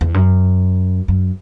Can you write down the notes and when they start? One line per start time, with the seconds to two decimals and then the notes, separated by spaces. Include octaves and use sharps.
0.01 E2
0.14 F#2
1.08 F#2